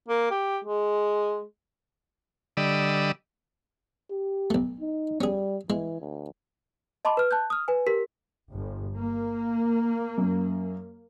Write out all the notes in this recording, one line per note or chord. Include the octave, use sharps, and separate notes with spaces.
A#3
G4
G#3
D3 G3 D5 D#5 B5 E6
G4
B1 A3
D#4
G3 C#4 G#4
E3 G#3
D2
D#5 A5 B5 C6 D6
B4 F6
A5 F#6 G6
D#6 F6
B4 G#5
G4 A#4 B6
G1
A#3
F#2